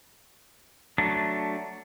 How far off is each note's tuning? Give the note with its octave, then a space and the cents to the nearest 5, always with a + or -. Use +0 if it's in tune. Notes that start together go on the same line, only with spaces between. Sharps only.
F#3 +10 A3 +10 D4 +0